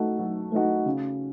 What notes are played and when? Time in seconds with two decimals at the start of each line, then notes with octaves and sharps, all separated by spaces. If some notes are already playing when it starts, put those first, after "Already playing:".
Already playing: A3 D#4 F#4
0.19 F#3
0.52 A3 D#4 F#4
0.86 C#3